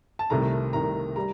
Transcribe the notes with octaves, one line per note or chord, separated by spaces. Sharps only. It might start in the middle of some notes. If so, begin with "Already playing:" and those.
A5
C2 C3 D#3 A3 A#5
C2 C3 D#3 A3 A#5
G3 A#5